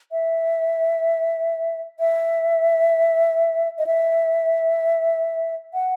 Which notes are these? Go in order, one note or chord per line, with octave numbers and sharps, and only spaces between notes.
E5
E5
D#5
E5
F#5